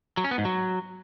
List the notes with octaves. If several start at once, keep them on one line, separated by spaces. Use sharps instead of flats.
F#3
C#4
B3
G#2
F#3